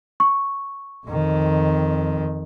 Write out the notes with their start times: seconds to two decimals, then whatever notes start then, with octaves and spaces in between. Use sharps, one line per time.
0.20 C#6
1.07 F2 D#3